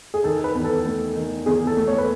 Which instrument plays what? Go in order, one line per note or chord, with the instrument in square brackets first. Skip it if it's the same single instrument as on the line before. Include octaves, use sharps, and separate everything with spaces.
[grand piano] G#4
[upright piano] D#3 [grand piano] A4
[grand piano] B4
[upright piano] E2
[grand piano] A4
[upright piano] A3
D#3
[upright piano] E2 [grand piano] G#4
[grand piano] A4
[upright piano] A3
[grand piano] C#5
B4